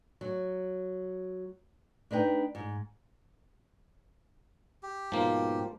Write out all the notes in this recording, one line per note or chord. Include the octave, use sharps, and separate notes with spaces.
F#3
D4 D#4 B4 G5
G#2
G4
G#2 B2 F3 A#3